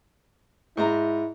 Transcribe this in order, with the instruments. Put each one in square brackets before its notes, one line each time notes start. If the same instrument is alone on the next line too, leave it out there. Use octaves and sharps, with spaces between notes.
[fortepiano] G#2 A#5 [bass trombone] E4